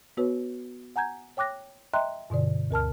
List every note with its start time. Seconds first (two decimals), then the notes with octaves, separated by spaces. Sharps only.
0.17 B3 F#4 B4 C#5
0.96 F#5 G#5 A#5 G6 G#6
1.37 C#5 G5 D6 F#6 A#6
1.94 D#5 E5 G5 A#5 C6 F#6
2.30 G2 B2 D3 D5
2.71 D2 A#4 A5 F6